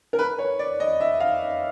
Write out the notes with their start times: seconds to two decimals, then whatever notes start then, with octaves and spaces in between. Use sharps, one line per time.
0.13 A#4
0.19 B4
0.38 C#5
0.59 D5
0.80 D#5
1.00 E5
1.20 F5